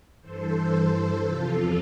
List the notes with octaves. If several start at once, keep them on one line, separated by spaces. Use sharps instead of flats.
G2 E3 A4 C5
E2 C3 F3 F4 A4